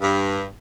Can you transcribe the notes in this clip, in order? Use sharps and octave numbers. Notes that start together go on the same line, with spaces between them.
G2